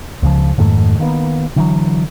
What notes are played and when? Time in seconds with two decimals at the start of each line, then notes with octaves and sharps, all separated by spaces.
0.22 C#2 C#3 F3
0.58 F2 G#2 D#3 A3
0.99 D#3 A#3 B3
1.56 D3 E3 F#3